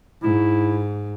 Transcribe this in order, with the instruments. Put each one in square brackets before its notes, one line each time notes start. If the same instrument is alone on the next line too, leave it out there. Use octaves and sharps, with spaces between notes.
[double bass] G#2 [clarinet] E4